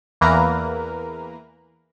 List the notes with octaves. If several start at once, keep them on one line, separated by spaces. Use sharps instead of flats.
E2 E3 A#3 A#4 B4 A#5